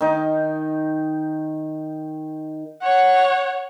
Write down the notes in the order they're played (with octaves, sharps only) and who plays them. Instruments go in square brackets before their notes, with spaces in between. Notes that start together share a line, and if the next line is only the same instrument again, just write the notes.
[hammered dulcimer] D#3 D#4
[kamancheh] C#5 F#5